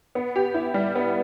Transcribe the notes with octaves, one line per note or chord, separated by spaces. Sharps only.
B3
G4
E4
G3
B3